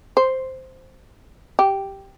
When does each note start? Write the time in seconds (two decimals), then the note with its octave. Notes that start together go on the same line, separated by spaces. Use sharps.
0.17 C5
1.59 G4